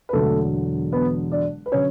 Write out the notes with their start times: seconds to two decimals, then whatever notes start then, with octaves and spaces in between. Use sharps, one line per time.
0.09 B4
0.13 E1 E2 D3 F#3 A3 A4
0.92 B3 B4
1.32 D4 D5
1.66 B4
1.72 D3 F#3 C#4 C#5